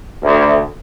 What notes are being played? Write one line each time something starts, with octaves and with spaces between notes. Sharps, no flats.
D2